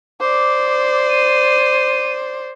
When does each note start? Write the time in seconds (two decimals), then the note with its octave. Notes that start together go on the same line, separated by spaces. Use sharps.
0.21 C5 D5 D6
1.10 D#7